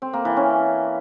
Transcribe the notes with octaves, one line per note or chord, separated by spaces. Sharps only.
C4
A#3
E3
C#4